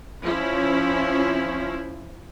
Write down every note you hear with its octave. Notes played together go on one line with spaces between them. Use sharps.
F3 C#4 E4